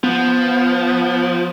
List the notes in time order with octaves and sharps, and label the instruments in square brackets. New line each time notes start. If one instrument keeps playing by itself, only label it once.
[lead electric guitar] F3 [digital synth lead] B3